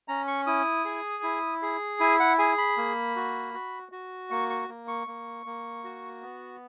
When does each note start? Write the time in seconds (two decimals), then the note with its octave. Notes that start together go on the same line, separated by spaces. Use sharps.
0.08 C#4 A#5
0.28 C#6
0.47 E4 D#6
0.85 G#4
1.23 E4
1.62 G#4
2.00 E4 G#5
2.20 F#5
2.39 G#4 G#5
2.58 B5
2.77 A#3
3.16 F#4
3.54 F#4
3.92 F#4
4.31 A#3 C#6
4.50 C#6
4.69 A#3
4.88 C#6
5.07 A#3
5.46 A#3
5.84 F#4
6.22 B3